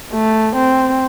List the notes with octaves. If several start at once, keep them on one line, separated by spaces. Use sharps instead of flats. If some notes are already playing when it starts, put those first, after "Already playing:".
A3
C4